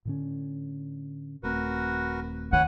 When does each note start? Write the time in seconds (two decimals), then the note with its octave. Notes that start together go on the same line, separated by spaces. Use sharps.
0.05 A2 D3 C#4
1.43 D#1 A3 C4 F#4 A#4 B4
2.53 D#3 B4 C#5 F#5 G#5